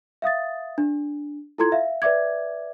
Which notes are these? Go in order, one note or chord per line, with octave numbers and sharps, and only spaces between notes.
E5 F5 D#6 A6
D4
E4 F4 A4 A#5 C6 G#6
E5 F5
B4 D5 E5 D6 G#6